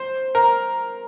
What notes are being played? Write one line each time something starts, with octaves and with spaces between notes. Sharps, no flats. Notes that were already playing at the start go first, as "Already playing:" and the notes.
Already playing: C5
A#4